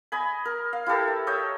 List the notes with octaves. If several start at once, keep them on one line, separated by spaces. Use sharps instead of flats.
D#5 G#5 B5
A#4
F5
E4 G4 A4 A#4
E5
C#5 D#5 E5 G5